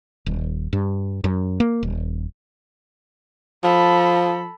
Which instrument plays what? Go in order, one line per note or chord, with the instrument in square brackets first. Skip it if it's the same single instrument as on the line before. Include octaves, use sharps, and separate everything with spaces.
[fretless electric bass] D#1
G2
F#2
A#3
D#1
[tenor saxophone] F3 [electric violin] A4 B5